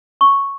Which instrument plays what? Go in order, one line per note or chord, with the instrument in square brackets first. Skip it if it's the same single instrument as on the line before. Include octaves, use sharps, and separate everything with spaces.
[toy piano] C#6